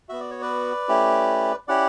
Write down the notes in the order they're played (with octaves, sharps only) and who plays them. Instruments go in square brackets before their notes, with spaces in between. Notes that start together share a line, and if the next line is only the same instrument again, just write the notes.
[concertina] B3 F#4 E5
D5
C#5
B4 D5
A3 C#4 E4 G4
C#4 E4 G4 D5 F#5